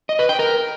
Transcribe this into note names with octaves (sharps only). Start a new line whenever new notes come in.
D#5
B4
G5
A#4